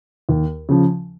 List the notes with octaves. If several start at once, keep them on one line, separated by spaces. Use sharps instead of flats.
D#2
C#3 F3